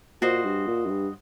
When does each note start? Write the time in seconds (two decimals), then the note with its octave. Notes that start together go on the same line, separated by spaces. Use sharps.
0.21 A#2 F#4 C5 D#5
0.45 G2
0.67 A#2
0.86 F#2
0.90 G2